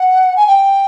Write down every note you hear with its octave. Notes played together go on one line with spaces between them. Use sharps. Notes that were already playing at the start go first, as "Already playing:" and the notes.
Already playing: F#5
G#5
G5